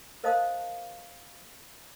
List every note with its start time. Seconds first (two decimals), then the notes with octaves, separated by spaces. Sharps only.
0.24 A#4 C5 D#5 F5 A5 D#6